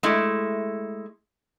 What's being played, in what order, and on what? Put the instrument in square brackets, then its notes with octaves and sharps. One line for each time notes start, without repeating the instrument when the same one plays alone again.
[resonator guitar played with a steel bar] G#3 A3 E4